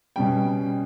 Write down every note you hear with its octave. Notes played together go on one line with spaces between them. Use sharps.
B2 G3 C#4 G5